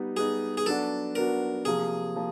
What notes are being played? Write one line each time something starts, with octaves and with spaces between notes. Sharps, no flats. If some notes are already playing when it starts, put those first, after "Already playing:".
Already playing: G3 B3 D#4
G3 B3 D#4 G#4
G#4
F#3 B3 D4 F#4 A4
F#3 B3 D4 F#4 A#4
C3 F3 A#3 G#4
F3 A#3